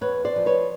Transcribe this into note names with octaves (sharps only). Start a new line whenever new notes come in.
E2 B4 C#5
C5 D5
F3
B4 C#5